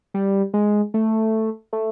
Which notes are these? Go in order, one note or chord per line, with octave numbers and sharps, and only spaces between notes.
G3
G#3
A3
A3